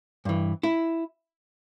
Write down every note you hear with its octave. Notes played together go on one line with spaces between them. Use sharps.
G2 E3
E4